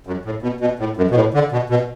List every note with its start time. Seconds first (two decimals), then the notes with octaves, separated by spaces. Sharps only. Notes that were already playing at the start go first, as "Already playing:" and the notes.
0.07 F#2
0.25 A2
0.42 B2
0.60 B2
0.79 A2
0.97 F#2
1.11 B2
1.15 A2
1.34 D3
1.52 B2
1.70 B2